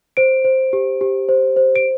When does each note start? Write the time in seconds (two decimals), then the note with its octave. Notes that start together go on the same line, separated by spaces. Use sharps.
0.17 C5 D7
0.44 C5
0.73 G4
1.01 G4
1.29 C5
1.56 C5
1.76 D7